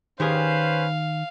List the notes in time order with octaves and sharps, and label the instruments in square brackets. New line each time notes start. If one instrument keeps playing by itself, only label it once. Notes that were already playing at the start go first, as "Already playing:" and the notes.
[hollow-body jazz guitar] D#3 G4 G#4 [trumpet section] C#4 B4 C5 [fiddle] F5